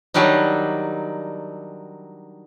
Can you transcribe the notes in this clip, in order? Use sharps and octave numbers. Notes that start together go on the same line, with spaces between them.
D#3 F#3 G3 D4 D#4